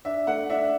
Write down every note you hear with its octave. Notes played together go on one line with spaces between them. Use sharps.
D4 E5
A3 F#5
D4 E5